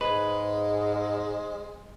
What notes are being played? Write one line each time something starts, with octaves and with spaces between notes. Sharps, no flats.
G#2 G#3 G#4 B4 C5 D#5